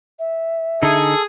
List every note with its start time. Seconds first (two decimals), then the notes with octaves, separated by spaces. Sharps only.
0.19 E5
0.83 D3 D#4 G#4 A4